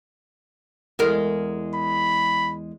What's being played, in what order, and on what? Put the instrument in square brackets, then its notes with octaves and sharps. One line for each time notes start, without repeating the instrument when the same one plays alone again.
[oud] E2 G#3 A#4
[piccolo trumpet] B5